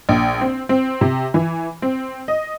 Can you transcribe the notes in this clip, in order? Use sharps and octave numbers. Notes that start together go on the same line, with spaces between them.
A#1
C4
C4
C3
E3
C4
D#5